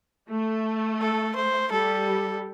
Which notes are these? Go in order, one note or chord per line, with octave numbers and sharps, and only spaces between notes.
A3
A4
C5
G3 A4